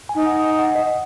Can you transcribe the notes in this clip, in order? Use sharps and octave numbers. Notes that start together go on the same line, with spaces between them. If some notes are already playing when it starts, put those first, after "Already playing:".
G#5
D#4
F#5
F#5
D#5